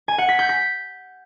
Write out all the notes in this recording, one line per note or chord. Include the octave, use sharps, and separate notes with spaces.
G#5
F#5
B6
G6
B6